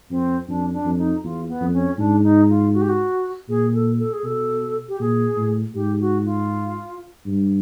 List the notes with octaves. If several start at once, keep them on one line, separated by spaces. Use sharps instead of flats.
F2 C4
F2 D4
D4
F2
D#4
E2 F4
B3
F2
C#4
G#2 D4
D#4
F4
F#4
G4
F#4
A#2 G#4
A4
A4
G#4
B2 A4
G4
A#2 G#4
A2
G#2 G4
F#4
F4
G2